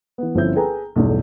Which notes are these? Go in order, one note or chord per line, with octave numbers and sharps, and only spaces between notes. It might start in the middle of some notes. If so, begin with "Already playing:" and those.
E3 B3
G1 F3 C4 C#4 E4 G6
G#4 A4 B4 G5 G#5 A#5
B1 E2 G2 A3